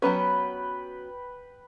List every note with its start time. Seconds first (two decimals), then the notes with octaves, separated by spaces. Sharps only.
0.02 F#3 B3 C#4 B4 G5